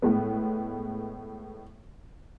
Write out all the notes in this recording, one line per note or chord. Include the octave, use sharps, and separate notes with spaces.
A2 G#3 B3